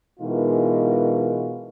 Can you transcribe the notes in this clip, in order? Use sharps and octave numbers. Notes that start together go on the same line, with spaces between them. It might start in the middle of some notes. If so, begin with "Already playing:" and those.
B2 E3 G#3 D#4 F4 A#4